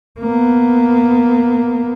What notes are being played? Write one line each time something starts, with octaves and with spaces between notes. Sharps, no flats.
A#3 B3